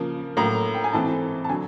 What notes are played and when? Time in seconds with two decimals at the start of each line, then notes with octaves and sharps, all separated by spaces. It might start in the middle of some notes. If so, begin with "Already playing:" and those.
Already playing: C#3 F3 A#3
0.37 A2 F#3 A#3 A#5
0.75 G5
0.84 G#5
0.93 G#2 E3 A3 C4 A5
1.44 A5
1.49 D3 F#3 G#5